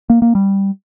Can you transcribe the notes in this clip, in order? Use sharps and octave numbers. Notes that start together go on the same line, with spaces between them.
A#3
A#3
G3